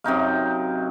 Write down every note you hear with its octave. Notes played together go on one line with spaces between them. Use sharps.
F#2 C3 D#4 F5